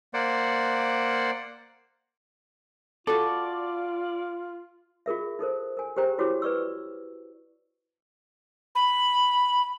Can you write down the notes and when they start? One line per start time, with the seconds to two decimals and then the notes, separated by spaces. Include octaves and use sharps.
0.14 A#3 C5 D5 F#5
3.07 F4 F#4 A4 D5
5.06 F4 G#4 A#4 E5
5.39 D#4 A4 A#4 C5
5.77 A#4 G#5
5.97 G4 G#4 A#4 C5 G5 A#5
6.19 E4 F#4 G4 C#5 D6
6.42 B4 D5 C#6 E6
8.75 B5